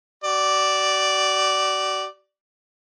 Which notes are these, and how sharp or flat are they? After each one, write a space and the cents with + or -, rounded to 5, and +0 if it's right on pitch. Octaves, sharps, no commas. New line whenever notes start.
F#4 +40 D5 +0